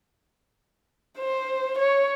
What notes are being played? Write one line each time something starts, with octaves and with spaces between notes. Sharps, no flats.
C5
C#5